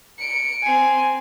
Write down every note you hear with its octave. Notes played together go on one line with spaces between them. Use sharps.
C#7 D7
C4 G#5